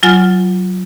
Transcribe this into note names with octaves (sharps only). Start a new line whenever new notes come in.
F#3 F4 G#5 F6 A6